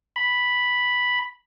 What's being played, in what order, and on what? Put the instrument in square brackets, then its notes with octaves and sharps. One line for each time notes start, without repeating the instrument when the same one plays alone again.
[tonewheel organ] B5